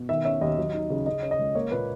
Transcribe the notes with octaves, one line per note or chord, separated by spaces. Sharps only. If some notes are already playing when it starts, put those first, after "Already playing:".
Already playing: B2
D#3 E5
C#4 E5
D#2 D#5
F#3
D#4
C#3
C#3 D#5
C#4
D#5
C#2
A#3 C#5
A#2 B4